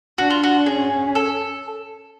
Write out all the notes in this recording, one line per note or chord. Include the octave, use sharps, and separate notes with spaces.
D4 F#4
F4
F#4
C#4 G#4
A4